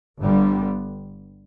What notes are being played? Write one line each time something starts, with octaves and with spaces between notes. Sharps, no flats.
G1 G2 D3 G3 B3